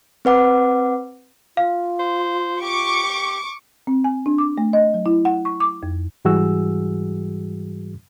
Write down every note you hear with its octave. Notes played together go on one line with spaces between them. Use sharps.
C4 B4 F#5 D6
F4 F5
C5
G4 C#6 D6
C4
G#5
D4
D6
A3
D#5
F#3
E4
F#5
C#6
D6
F2
G#2 E3 G3 F#4 G#4 E6